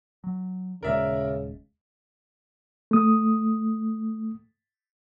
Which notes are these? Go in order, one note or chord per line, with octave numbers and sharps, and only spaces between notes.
F#3
D#1 C#3 G#3 A#4 D5 E5
A3 D#6